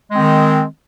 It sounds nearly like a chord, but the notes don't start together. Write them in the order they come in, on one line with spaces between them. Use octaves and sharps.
G#3 C4 D#3